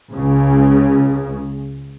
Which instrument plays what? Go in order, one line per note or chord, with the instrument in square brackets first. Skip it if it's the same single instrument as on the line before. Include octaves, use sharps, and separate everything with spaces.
[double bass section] C#2 C#3